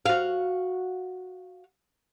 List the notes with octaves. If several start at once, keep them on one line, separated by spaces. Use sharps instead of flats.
F#4 F5